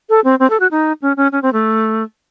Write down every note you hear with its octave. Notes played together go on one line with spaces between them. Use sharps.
A4
C4
C4
A4
F#4
D#4
C#4
C#4
C#4
C4
A3